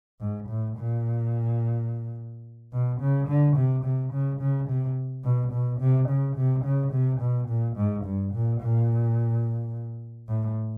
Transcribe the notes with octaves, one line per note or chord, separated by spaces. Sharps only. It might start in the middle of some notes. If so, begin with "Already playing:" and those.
G#2
A2
A#2
B2
C#3
D3
C3
C3
C#3
C#3
C3
B2
B2
C3
C#3
C3
C#3
C3
B2
A#2
G#2
G2
A#2
A#2
A2